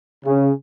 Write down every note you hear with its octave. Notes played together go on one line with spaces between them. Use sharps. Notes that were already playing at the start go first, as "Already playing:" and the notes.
C#3